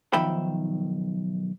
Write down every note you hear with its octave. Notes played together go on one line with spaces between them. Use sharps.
B1 D#3 F3 E5 G5 B5